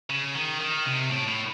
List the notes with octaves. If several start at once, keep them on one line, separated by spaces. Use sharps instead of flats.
C#3
D#3
D#3
C3
A2
A2